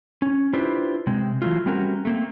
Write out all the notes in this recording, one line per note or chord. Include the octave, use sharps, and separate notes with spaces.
C#4
D4 E4 F4 G4 B4 C5
C3 G#3 C4
E3 F#3 A3 F4
G3 A3 C4 C#4 F#4 A#4
A3 A#3 C4